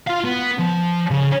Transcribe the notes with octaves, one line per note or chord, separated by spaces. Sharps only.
F4 F5
B3
F3
C#3